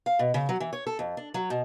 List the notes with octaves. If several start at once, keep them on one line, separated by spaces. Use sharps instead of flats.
F5
B2
C#3
F#3
E3
C#5
A4
F2
D4
F#3
B2